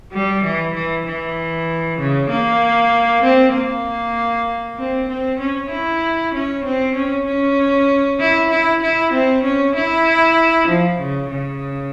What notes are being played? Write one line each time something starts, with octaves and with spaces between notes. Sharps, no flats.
G3
E3
E3
E3
C#3
A#3
C4
A#3
C4
C4
C#4
E4
C#4
C4
C#4
C#4
E4
E4
E4
C4
C#4
E4
F3
C#3
C#3